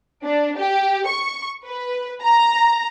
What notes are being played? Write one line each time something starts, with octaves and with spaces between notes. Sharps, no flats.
D4
G4
C#6
B4
A#5